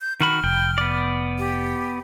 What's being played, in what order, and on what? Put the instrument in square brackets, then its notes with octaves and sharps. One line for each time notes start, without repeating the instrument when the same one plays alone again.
[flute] G6
[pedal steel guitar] D#3 F#4 B5 [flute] F6
[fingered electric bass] F1 [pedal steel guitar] G5
[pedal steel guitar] B3 D5
[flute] G4